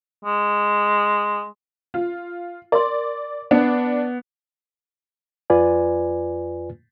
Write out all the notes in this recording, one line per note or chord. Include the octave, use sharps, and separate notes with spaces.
G#3
F4
A#4 D5 C6
B3 D4
F2 F4 B4 D5 G#5